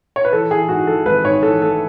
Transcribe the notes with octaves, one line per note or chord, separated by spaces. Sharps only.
C#5
B4
E3 A4
E3 G#4
G#2 F#4
E3 A4
G#1 B4
G#2 C#5
E3 A4
A3 A4